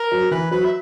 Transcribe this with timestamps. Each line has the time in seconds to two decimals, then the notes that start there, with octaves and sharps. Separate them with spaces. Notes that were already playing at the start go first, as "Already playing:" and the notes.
Already playing: A#4
0.12 F#3
0.31 E3 B4
0.51 F#3 B4
0.65 E5